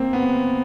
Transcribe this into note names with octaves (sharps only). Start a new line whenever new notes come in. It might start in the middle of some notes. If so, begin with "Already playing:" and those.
Already playing: A#3 C4
B3